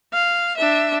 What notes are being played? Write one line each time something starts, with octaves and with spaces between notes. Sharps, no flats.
F5
D4 E5